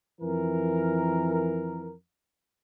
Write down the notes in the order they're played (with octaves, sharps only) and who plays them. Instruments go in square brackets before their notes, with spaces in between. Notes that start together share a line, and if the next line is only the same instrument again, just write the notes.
[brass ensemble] F2 E3 A#4